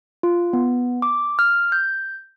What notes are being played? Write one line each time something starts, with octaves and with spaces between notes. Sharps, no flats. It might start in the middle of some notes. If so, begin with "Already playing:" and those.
F4
B3
D6
F6
G6